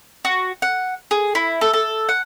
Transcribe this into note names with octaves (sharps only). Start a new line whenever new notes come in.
F#4
F#5
G#4
E4
A4
A4
F#5